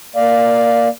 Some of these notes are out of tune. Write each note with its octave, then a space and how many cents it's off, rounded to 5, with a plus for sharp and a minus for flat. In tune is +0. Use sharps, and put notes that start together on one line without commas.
A#3 +0 D5 +0 F5 +0